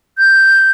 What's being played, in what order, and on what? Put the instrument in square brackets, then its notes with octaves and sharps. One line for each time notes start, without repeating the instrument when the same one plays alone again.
[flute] G6